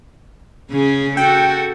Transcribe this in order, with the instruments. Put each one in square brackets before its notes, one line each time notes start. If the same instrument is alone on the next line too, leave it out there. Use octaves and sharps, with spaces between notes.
[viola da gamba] C#3 C#4 G#4
[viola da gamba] F#4 A4 [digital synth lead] G5